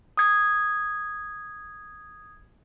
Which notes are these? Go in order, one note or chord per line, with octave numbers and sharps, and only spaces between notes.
D#6 G#6